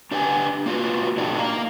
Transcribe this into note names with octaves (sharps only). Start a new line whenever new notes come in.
D4 G4 B4 G5 G#5
A#3 F4 F#4 B4
A#2 A3 D4 D#4 G4
A#3 F5 A#5